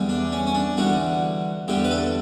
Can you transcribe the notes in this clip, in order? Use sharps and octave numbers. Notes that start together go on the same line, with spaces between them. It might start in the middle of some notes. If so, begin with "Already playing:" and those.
Already playing: E2 D3 G3
D4
C#4
C#4
D4
E2 D3 G3 F#4
E2 D3 G3 G4
B4
A4